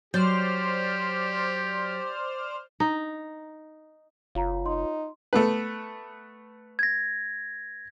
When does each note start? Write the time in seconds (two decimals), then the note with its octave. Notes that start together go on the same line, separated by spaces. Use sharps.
0.14 F#3 G4 C5 D5 F6
2.80 D#4
4.35 F#1 F4 C#5 F5 A#5
4.66 D#4 C6
5.33 A3 B3 B4
6.79 G#6 A#6